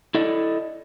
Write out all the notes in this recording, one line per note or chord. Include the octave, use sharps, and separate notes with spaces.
E4 A4 D5 D#5